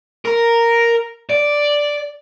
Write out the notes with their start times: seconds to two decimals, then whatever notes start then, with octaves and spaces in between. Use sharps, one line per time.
0.25 A#4
1.30 D5